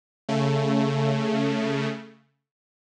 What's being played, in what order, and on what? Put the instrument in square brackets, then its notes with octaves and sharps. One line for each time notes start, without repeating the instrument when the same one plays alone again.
[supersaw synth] C#3 A3